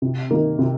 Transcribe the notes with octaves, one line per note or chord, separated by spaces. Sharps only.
C3
D#3 A#3
C3